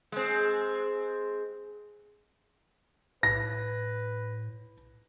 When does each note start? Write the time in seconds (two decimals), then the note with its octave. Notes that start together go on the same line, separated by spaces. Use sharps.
0.12 G#3 C4
3.23 A2 B4 A#6